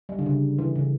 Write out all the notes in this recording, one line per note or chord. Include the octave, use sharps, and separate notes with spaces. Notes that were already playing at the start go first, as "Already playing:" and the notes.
G3
D3
C#3
E3
C#3